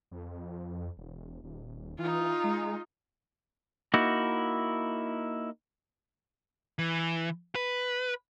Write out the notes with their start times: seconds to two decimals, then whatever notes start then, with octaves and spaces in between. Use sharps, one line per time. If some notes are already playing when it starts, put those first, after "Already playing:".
0.11 F2
0.97 E1
1.43 D#1
1.99 E3 D#4 F4
2.44 G#3
3.94 A#3 D#4 E4 F#4
6.79 E3
7.55 B4